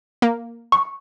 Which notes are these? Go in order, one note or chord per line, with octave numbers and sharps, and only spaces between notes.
A#3
C#6